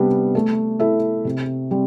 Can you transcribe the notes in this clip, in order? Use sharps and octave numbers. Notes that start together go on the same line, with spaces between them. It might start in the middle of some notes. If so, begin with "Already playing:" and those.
Already playing: C3 G3 B3 D4
A3
E4 A4 E5
C3
G3 C4